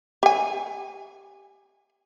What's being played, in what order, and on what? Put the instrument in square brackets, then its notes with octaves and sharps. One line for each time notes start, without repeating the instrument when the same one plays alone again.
[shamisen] G4 G#5